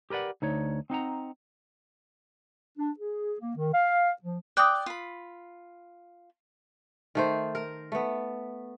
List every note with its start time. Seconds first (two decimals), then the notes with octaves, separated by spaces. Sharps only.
0.10 G4 A#4 B4 D5 F#5
0.42 D2 D#4 C#5
0.90 C4 D#4 F#5 A#5
2.78 D4
2.99 G#4
3.40 A#3
3.56 D#3
3.74 F5
4.22 F3
4.57 D5 G5 D6 D#6 F#6
4.86 F4 B5
7.15 D#3 A3 C5
7.55 A#4
7.92 A3 B3